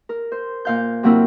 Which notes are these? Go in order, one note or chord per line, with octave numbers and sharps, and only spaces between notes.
A#4
C5
A#2 F5 G6
C3 F#3 A#3 C4 E4 A#4